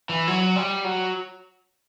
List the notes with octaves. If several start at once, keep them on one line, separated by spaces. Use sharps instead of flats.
E3
F#3
G3
F#3